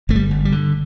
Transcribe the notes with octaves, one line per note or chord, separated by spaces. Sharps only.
G1 A3
G3
G1
G3
D3